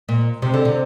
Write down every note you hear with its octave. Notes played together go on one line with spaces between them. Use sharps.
A#2
C3
D3
C3